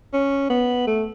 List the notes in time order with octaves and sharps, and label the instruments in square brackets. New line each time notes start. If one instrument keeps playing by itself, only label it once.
[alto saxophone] C#4
B3
A3